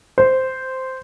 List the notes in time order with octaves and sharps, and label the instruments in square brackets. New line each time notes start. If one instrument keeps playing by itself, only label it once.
[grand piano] C5